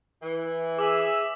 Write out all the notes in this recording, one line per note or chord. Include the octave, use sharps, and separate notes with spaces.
E3
G#4 E5 D6 E6